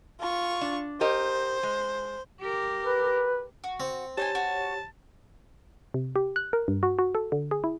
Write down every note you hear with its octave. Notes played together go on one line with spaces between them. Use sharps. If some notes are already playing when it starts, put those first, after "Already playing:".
F4 C#6
D4
G4 A#4 C5 D#5
G#3
G4 A#4
B4
F#4
C4
D#4 G4 C5 C#5 G#5 A5
F#4
C3
G4
F#6
A#4
G2
F#4
F#4
A4
D3
G#4
E4